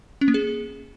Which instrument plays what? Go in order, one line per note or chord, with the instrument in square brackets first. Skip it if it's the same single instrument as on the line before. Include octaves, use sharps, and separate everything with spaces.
[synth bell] C#4
A#3
G#4